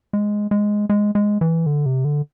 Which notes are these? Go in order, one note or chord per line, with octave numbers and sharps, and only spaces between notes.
G#3
G#3
G#3
G#3
E3
D3
C3
D3